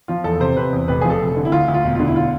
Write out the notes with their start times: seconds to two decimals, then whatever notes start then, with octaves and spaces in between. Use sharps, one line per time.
0.08 F3 F4
0.24 E2 A4
0.40 C3 C5
0.57 C3 B4
0.73 E2
0.88 F1 B4
1.01 F3 G#4
1.10 A4
1.21 F1
1.37 D3
1.45 E4
1.52 D2 F4
1.68 D2
1.74 F4
1.84 E1
1.95 D3 F4
2.08 E4
2.16 F4